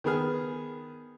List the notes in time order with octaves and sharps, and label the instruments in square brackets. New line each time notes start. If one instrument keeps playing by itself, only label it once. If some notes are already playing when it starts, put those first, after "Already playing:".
[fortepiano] D#3 B3 G#4 F6